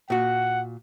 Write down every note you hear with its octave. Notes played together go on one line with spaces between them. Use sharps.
A#2 F#4 F#5